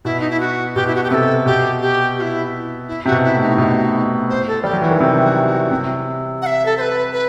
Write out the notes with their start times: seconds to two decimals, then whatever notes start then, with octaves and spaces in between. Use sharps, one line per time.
0.05 B2 E4
0.20 D#4
0.30 E4
0.40 F#4
0.75 B2 G4
0.87 E4
0.95 F#4
1.03 G4
1.10 C3 A4 B4
1.46 B2 G4
1.81 G4
2.17 F#4
2.22 E4
2.88 E4
3.06 C3 F#4
3.12 B2
3.24 E4
3.35 A2
3.41 D#4
3.58 B2
4.30 C5
4.47 A4
4.64 G3 G4
4.73 F#3
4.82 E3 F#4
4.91 D#3
5.00 C3
5.71 C3
6.42 F#5
6.46 E5
6.66 A4
6.78 C5
6.81 B4
7.13 B4